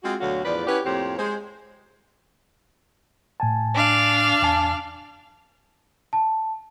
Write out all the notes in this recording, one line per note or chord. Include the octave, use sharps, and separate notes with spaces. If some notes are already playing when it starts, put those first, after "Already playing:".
G#3 C4 F4 F#4
D2 B2 D3 F#3 F#4 F5
E2 A2 F3 B4 D5
C#4 E4 F#4 G4 B4 C#5
F2 A2 A#3 C4 G4 C#5
G#3 C5
A2 G#5 A5
D4 F5
E2 G#5 A5
A5